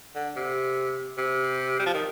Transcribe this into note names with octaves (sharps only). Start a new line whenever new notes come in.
D3
C3
C3
G3
F3
D#3